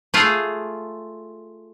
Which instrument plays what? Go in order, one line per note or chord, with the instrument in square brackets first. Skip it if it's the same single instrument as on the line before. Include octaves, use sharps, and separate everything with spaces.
[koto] A3 F4 G#4